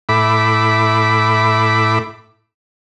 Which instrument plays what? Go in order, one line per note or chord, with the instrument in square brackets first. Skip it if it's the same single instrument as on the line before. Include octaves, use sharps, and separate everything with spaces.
[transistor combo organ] A2 E4 B5 D6